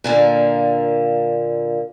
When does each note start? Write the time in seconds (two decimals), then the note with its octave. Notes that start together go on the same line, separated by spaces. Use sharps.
0.04 A#2 D3 A#3